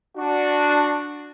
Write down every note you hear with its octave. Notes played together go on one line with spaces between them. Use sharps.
D4 F#4